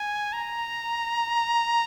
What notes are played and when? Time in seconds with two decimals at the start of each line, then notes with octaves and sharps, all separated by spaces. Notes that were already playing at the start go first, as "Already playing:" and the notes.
Already playing: G#5
0.33 A#5